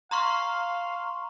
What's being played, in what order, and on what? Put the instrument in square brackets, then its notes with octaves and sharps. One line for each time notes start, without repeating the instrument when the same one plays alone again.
[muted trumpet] F5 [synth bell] A#5 C6 C#6